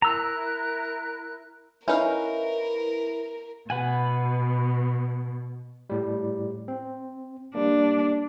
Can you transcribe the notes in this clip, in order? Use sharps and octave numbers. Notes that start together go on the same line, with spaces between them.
E4 A#4 A#5 E6 F#6
C#4 D#4 E4 A#4 B4 F5
B2 B4 F#5 G#5
A2 G3
C4
G3 A#3 D4